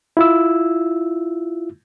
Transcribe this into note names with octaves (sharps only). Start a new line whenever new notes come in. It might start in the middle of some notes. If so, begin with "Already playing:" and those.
E4 F4 E6